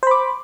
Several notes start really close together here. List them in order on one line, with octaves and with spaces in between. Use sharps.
C5 B5 D6